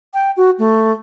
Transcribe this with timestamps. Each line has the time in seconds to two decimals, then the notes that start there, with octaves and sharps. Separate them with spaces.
0.14 G5
0.37 F#4
0.59 A3